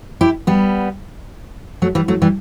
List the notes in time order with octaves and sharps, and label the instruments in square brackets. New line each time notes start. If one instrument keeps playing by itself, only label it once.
[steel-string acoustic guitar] E4 G4
G3 B3
F#3 A3
E3 G3
F#3 A3
E3 G3